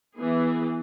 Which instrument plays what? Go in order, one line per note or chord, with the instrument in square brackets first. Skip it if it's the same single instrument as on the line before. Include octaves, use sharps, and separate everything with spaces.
[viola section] E3 B3 G#4